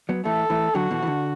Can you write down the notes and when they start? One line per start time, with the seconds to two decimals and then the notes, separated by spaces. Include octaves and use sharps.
0.09 F#3 B3
0.25 E3 A3 A4
0.50 E3 A3
0.75 D3 F#3 F#4
0.91 B2 E3
1.02 E3
1.07 D3